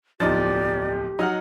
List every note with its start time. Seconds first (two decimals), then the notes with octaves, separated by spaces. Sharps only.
0.20 D1 B1 F3 D#4 G4 D5 A6
1.19 F#3 D#4 D#5 F#5 F6